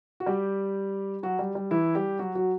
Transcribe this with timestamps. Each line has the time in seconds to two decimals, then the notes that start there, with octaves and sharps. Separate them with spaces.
0.20 F#4
0.26 G3 G4
1.23 F#3 F#4
1.39 G3
1.55 G3
1.71 E3 E4
1.95 G3 G4
2.19 F#3 F#4
2.35 F#3 F#4